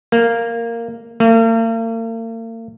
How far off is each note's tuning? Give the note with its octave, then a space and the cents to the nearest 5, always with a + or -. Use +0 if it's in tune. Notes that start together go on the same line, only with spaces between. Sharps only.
A#3 -10
A#3 -45